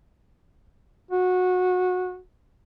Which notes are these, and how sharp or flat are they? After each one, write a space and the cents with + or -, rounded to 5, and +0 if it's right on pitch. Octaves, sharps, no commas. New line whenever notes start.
F#4 -20